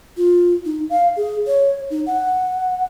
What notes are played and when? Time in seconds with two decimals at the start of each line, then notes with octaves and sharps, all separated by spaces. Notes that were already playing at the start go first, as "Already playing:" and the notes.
0.17 F4
0.65 D#4
0.90 F5
1.17 G#4
1.47 C#5
1.90 D#4
2.06 F#5